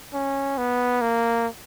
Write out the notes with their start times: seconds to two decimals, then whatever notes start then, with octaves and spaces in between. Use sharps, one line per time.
0.14 C#4
0.58 B3
1.01 A#3